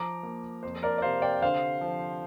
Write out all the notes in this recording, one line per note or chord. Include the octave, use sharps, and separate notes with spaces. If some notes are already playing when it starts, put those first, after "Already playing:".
Already playing: F3 A#5 D6
A#3
F2 C5
A#4 D5
D5
C3 C5 F5
D5 G5
D3 C5 F5
F3